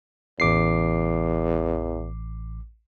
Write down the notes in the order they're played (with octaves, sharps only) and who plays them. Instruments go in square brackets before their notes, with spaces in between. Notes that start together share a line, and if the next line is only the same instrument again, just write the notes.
[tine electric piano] A1 D6 C7 [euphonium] E2